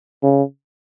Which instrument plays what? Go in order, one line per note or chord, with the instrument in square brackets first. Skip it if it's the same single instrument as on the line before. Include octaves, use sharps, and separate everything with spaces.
[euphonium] C#3